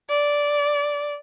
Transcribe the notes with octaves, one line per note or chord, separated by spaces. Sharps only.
D5